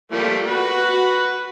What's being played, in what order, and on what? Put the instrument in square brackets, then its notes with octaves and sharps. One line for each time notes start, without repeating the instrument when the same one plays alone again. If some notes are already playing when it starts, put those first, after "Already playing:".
[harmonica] F3 G3 A3 [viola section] A#3
[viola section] F#4 [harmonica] B4